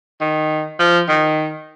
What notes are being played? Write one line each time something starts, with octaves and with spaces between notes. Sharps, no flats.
D#3
F3
D#3